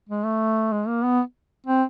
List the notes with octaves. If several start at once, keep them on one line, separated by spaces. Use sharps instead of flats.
G#3
A3
G#3
A#3
B3
C4